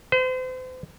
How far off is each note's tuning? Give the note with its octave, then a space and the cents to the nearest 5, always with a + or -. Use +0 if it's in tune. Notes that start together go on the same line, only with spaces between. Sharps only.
C5 -35